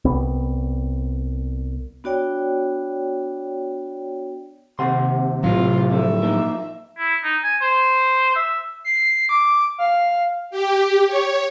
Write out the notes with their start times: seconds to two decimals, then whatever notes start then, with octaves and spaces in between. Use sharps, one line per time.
0.05 C2 B3
2.04 B3 D4 F#4 C#5 D5 G5
4.79 D#2 C3 F#5 C6
5.44 A2 F#3 F4
5.93 D3 F3 E5
6.22 F3 A#3 D#4
6.98 E4
7.23 D#4
7.43 G#5
7.62 C5
8.35 E5
8.84 C7
9.29 D6
9.78 F5
10.51 G4
11.07 C#5